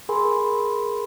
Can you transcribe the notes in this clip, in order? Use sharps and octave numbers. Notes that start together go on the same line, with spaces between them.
G#4 A#4 G#5 B5 C6